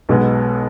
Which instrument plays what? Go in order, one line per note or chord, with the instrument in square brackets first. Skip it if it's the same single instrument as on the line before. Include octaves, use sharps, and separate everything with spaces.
[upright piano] B1 B2 G#3 B3